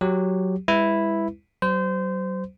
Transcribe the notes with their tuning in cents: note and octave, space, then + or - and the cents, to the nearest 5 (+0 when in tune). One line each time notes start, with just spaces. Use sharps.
F#3 +0 G4 +0
G#3 -45 E4 +0 B4 +0
F#3 +35 C5 -25